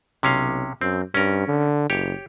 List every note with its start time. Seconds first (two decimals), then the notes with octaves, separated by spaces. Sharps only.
0.23 B1 C3 C#4 F5
0.81 F#2 C4
1.14 G2 C#4 A#4
1.48 D3
1.90 F#1 G4 C#5